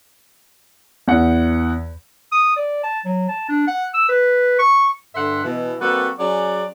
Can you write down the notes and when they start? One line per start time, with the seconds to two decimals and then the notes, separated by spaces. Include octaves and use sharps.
1.08 E2 F#5
2.32 D#6
2.57 D5
2.83 A5
3.05 F#3
3.29 A5
3.49 D4
3.67 F#5
3.94 E6
4.09 B4
4.59 C#6
5.15 G2 D3 A4 E5 F#5 C6
5.44 B2 E3
5.80 G3 A#3 C4 F#4 A4 B4
6.19 F#3 C#4 G#4 D5